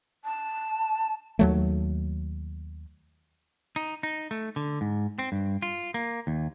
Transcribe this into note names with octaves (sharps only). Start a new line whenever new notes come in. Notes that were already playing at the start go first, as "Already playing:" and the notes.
A5
D#2 F#3 A3
D#4
D#4
A3
D3
G#2
C4
G2
F4
A#3
D#2